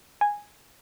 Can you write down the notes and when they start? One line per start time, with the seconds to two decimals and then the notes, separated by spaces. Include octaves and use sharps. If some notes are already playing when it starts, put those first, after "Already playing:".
0.21 G#5